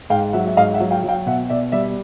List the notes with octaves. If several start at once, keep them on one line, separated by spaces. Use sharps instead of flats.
G#2 F5 G5
F#3 E5 F#5
E5
G#2 D#5 F5
E5 F#5
F#3
F5 G5
F#3
F5 G5
B2 E5 F#5
B2 D5 E5
G3 D5 E5